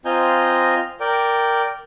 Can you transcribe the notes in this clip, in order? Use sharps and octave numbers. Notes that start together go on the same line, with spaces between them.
C4 F4 D#5 G#5 A#5 G6
A#4 D5 G5